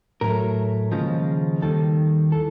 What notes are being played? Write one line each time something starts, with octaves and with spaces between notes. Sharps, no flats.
A2 F#3 A3 A#4
D#2 C#3 F3 G#3
D#2 D#3 G3 A4
E3 A4